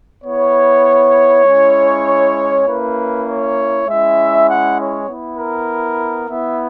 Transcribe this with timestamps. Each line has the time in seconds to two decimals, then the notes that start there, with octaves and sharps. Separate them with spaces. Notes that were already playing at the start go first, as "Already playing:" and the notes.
0.24 B3 E4 C#5
1.45 G#3 C#4 E4
2.66 A#3 C#4 E4 B4
3.26 C#5
3.87 G#3 C#4 E4 E5
4.47 F#5
4.78 C#5
5.08 B3 E4
5.39 A#4
6.29 B3 E4 E5